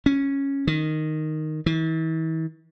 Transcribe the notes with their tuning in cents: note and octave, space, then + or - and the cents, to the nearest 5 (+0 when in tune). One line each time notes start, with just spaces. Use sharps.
C#4 -5
D#3 -5
E3 -40